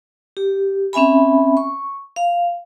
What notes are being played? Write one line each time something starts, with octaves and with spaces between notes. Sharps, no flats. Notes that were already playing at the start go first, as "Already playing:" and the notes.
G4
C4 C#4 E5 G#5 B5
C#6
F5